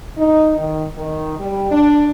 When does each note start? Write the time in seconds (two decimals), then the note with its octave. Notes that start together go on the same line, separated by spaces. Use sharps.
0.17 D#4
0.58 D#3
0.97 D#3
1.39 G3
1.72 D4